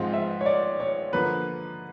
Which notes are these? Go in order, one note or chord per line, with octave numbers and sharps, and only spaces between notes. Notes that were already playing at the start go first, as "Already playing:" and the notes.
Already playing: G#2 F3 G#3 C4 F4
E5
C#5
D5
C#5
D3 F3 A#3 B4